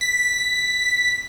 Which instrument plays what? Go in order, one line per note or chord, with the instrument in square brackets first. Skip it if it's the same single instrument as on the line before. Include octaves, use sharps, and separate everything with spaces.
[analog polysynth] B6